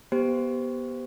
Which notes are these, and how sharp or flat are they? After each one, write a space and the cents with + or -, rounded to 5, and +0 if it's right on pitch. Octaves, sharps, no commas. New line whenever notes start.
B3 -20 G4 +0 C5 -15